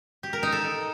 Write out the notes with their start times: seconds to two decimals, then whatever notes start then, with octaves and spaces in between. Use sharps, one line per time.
0.23 G4
0.33 A#4
0.43 D#4
0.52 A4